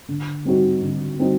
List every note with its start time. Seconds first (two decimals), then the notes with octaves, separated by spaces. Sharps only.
0.08 D3
0.45 G3 C4 D#4 F#4
0.82 D3
1.19 G3 C4 D#4 F#4